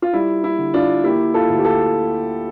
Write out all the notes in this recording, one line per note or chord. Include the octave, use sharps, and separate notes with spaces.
F4
G3 E4
E4
D3
D4 F4
A#3 E4 G4
F4 A4
D2
G4
F4 A4